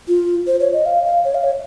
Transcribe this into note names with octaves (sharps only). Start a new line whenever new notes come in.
F4
C5
C#5
D#5
F5
F5
C#5
F5
C#5